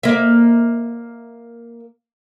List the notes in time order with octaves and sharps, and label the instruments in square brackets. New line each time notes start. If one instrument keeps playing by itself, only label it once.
[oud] A#3 E5